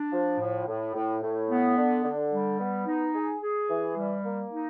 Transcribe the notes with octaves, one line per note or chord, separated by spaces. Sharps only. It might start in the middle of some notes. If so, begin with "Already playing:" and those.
Already playing: D4
F3
A2
A2
A2
A2
B3
D3
D3
G3
B3
D#4
G#4
G#4
E3
G3
A#3
D#4